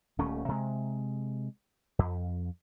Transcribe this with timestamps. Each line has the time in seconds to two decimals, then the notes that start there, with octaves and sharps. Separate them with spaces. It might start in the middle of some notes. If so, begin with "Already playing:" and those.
0.18 D#1 D#2 A3 C#4
0.49 C3 G#3
1.99 F2